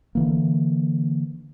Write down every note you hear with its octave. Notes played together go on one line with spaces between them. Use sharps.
D3 E3 A#3